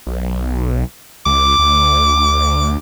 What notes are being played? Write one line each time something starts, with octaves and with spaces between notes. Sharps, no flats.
B1
C#2 D6
D2